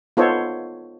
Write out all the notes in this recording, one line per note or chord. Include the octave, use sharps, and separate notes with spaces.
B3 D#4 F4 A4 C5 C#5